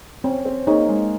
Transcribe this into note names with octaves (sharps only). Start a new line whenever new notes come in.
C4 C#4
C4
A#3 D#4 G#4 C#5
G#3